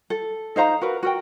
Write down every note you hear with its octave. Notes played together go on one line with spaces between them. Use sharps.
A4
D#4 C5 F5 A#5
F#4 A#4 B4
F#4 A#4 G5